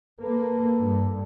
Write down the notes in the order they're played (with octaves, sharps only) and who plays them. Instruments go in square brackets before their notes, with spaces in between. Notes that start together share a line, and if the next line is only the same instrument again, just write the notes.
[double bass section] A#3 [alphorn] A4 [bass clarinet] B4
[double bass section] G2